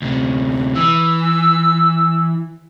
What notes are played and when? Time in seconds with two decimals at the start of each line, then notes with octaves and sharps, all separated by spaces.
0.02 D2 C3
0.75 E3 E6